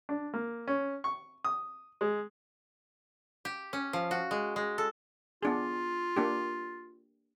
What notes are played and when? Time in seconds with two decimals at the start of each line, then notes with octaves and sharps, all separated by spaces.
0.09 D4
0.34 A#3
0.68 C#4
1.04 C#6
1.45 D#6
2.01 G#3
3.45 G4
3.73 C#4
3.93 F3
4.11 F#4
4.31 G#3
4.56 G#3
4.78 A4
5.43 B3 D4 F4 G#4
6.16 A#3 D4 G4